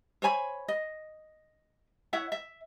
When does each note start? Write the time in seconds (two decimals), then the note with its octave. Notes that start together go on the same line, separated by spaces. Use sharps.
0.22 C5 C#5 G#5 B5
0.68 D#5
2.13 E4 C#5 E5 F#5
2.32 E5